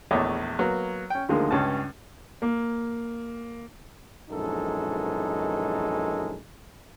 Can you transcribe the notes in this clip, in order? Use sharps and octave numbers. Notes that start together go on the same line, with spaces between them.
A#1 E2 A3 C#5 D#5 D6
F#3 A#3 B3
C#4 G5
D2 D3 D#3 F3 G#3 A#3
C#2 G2 C#4 A5
A#3
A#1 F#2 E3 G#3 D#4 A4